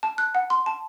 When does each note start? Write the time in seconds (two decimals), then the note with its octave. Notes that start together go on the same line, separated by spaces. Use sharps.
0.03 A5
0.18 F#6
0.35 F#5
0.50 C6
0.66 A5